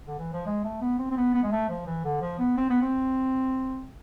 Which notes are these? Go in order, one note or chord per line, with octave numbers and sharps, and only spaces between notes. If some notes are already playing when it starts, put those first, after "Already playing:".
D3
E3
F3
G#3
A3
B3
C4
C4
B3
B3
G#3
A3
F3
E3
D3
F3
B3
C4
B3
C4